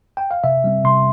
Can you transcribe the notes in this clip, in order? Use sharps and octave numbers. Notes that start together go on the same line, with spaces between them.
G5
F5
C3 E5
G3 C4
C3 C6